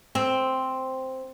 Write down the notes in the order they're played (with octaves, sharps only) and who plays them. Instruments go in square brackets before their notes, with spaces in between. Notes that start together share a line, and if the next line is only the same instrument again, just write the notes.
[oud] C4